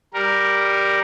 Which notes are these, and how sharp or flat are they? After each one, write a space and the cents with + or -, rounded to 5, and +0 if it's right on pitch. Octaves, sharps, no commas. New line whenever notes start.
G3 +0 A#4 +0